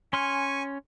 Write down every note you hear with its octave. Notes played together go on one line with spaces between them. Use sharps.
C#4 G#5 C6 C#6 F6